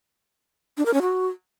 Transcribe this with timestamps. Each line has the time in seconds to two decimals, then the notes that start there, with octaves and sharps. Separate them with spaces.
0.77 D4
0.85 A#4
0.93 C#4
1.01 F#4